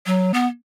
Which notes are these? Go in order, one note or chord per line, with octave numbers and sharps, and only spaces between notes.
F#3
B3